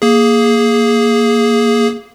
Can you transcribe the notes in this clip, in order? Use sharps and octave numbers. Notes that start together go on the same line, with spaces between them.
A#3 G#4